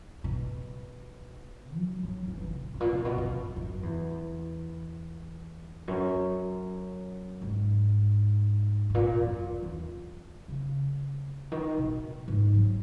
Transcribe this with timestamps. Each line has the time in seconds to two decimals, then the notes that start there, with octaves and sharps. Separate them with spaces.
0.24 B2
1.77 F#3
2.03 F#3
2.28 E3
2.41 E3
2.55 A#2
2.74 G#2
2.80 A#2
2.93 A#2
3.05 B2
3.18 B2
3.30 F#2
3.56 F#2
3.83 E2
5.88 F#2
7.41 G#2
8.90 G#2
8.95 A#2
9.21 F#2
9.46 E2
9.63 E2
10.48 C#3
11.52 D#3
11.77 B2
12.28 G#2
12.54 F#3